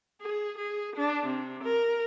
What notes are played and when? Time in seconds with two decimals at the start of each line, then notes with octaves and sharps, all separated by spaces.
0.20 G#4
0.56 G#4
0.95 D4
1.25 C3
1.62 A#4